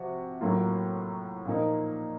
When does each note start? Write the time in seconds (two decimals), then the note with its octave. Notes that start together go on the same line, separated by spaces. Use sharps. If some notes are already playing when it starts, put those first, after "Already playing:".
Already playing: C3 F3 F#4
0.41 A2 F#3 A#3 F4
1.45 A#2 F3 A#3 D#4